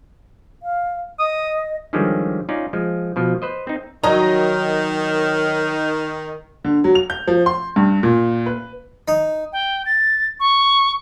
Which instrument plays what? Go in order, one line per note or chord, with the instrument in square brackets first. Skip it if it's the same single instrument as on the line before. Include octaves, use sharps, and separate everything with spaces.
[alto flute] F5
[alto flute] D#5 [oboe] D#6
[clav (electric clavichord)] D3 D#3 F3 G3 G#3 C#4
C#4 D#4 F4 D5
F3 G#3
B2 F3
B4 C5 D#5
C4 D#4
[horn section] D#3 [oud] F#3 D#4 [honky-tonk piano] D#5 A#5
[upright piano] D3
F#3
F7
G6
F3
C6
G2
A#2
B4
[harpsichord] D#4
[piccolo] G5
A6
C#6